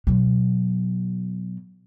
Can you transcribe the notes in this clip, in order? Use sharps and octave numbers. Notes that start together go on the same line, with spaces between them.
B2 F#3